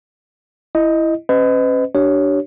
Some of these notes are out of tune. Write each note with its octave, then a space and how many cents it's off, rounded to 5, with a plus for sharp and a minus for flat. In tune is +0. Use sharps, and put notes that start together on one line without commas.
E4 +5 D#5 +0
C#4 -30 B4 +40 D#5 +0
D4 +0 G4 -35 C#5 +5